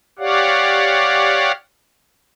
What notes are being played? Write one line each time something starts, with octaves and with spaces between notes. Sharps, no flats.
G4 C#5 D5 F5 F#5